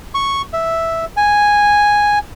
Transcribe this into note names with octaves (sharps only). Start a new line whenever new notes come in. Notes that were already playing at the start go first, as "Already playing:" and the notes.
C#6
E5
G#5